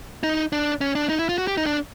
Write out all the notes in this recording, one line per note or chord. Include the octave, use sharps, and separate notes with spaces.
D#4
D4
C#4
D4
D#4
E4
F4
F#4
G4
D#4
D4